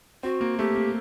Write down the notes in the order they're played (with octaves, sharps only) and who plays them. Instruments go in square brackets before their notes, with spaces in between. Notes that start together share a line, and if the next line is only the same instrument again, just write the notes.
[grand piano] C4 [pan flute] F#4
[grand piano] A#3
[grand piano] A3 [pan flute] G4
[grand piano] A#3